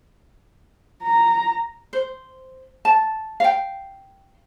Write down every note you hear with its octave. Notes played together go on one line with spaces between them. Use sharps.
A#5
C5
A5
F5 G5